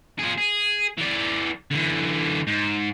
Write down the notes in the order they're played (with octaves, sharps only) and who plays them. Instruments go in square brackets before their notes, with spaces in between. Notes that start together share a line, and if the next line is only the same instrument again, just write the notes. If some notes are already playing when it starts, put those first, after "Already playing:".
[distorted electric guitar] F3 G#4
G#4
E3 D5
D3 E3
G#2